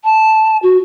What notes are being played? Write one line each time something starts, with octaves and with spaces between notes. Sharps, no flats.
A5
F#4